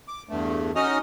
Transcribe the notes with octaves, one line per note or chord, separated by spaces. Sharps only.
D6
E2 G2 A3
C#4 D#4 F#4 D#5 D#6 F6